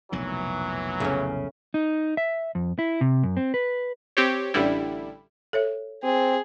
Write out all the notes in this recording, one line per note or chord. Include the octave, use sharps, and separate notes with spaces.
F1 B1 A#2 E3 F#3
A2 C#3 C#4
D#4
E5
F2
E4
C3
F#2
C4
B4
C4 G4 C#5
A1 D3 G3 E4
A4 C#5 E5
C4 G#4